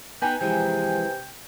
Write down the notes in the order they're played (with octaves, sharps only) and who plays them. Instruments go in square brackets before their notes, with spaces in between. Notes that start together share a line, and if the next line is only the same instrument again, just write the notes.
[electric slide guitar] B3 D#4 [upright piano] B4 G#5 A#5 [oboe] G5
[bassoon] C3 [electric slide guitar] E3 F3 G#3 [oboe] G5